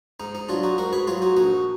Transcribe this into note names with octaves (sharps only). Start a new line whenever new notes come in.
G#2 D#4
D#4
F#3 D4 F4
D#4 F#4
G#2 F#4 A#4
G#4 B4
F#3 F4 G#4
D#4 F#4
A#1 D#4 F#4